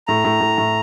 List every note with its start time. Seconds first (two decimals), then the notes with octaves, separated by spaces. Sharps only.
0.08 A2 A#5
0.25 A2
0.41 A2
0.58 A2